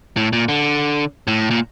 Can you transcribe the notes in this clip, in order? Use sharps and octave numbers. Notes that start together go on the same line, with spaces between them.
A2
A#2
D3
A2
A#2